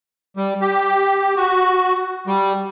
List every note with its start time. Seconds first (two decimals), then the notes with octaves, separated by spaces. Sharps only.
0.37 G3
0.61 G4
1.37 F#4
2.27 G3